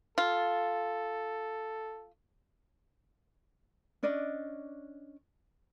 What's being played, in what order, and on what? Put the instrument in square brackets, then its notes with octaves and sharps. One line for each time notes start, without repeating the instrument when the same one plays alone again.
[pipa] F4 [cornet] A4
[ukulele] C#4 D4 D5 D#5